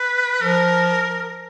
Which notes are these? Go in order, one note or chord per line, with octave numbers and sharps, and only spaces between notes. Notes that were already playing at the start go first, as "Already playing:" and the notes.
Already playing: B4
F3 A#4